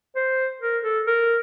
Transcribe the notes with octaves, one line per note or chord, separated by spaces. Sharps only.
C5
A#4
A4
A#4